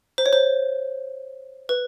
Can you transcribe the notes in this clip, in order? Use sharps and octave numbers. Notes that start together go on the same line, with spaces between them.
C5
C#5
C5
B4